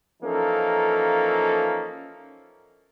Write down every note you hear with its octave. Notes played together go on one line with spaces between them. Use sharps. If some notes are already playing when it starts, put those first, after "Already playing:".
E3 F3 A#3 C#4 D#4 A4